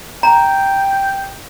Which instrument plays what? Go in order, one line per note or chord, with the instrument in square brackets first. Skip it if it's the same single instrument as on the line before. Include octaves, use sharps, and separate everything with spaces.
[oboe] G5 [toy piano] A#5